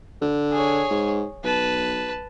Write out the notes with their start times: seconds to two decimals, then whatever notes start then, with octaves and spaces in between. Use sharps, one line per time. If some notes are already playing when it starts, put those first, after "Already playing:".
0.22 D3
0.52 G#4 C#5
0.91 G#2
1.44 B1 B4 A5